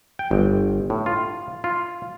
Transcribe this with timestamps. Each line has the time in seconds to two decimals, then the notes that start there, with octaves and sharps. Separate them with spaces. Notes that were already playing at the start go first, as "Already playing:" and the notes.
0.19 G5
0.31 G1
0.90 A2
1.06 F4
1.64 F4